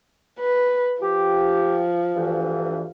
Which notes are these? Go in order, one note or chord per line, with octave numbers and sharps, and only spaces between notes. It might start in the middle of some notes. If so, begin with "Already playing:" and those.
B4
F3 G4
D2 G2 E3